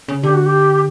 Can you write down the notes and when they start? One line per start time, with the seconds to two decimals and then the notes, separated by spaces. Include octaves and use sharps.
0.08 C#3
0.23 D3 G4
0.34 F#4
0.46 G4